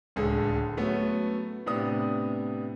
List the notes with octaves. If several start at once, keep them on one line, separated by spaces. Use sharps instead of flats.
D1 C#2 D3 G#4 A4
F#3 A3 B3 C#4 F#4
A2 C3 B3 D4 D#6